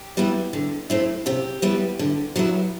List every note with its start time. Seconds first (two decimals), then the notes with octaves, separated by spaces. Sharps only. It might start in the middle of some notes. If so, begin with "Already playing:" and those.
Already playing: G4
0.17 G3 B3 E4
0.53 D3
0.90 A3 C4 E4
1.26 C3 G4
1.62 G3 B3 E4
1.99 D3
2.36 F#3 B3 E4